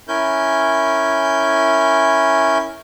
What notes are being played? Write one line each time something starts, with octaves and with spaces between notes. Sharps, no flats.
C#4 E4 A#4 G#5 G6